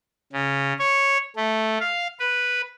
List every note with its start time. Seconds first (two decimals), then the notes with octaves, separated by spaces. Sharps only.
0.33 C#3
0.79 C#5
1.36 A3
1.80 F5
2.19 B4